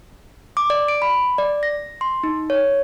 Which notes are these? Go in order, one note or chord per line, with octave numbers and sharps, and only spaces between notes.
D6
D5
D7
B5
D5
A#6
C6
D#4
C#5